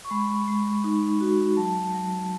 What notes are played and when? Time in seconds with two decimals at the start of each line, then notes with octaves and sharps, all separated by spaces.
0.05 C#6
0.11 G#3 B5
0.48 G#3
0.84 D#4
1.21 F#4
1.57 F#3 A5
1.94 F#3